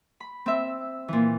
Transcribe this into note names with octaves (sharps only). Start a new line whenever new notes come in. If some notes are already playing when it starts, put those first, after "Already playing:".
B5
C4 E5
A#2 E3